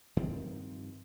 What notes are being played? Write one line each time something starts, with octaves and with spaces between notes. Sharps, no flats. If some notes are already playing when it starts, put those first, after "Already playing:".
G2 D#3 F3 C4